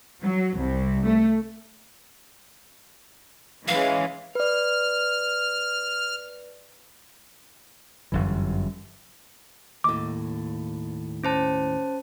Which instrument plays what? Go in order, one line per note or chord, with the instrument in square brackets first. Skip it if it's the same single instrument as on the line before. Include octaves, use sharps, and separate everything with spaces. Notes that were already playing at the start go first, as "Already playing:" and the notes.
[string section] F#3
C2
A3
[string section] E3 G#3 C#4 [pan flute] F5
[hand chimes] B4 D5 [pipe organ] F6
[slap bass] G1 F#2 E3
[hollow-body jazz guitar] D#2 A2 [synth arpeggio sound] D6
[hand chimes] C#4 C5 A5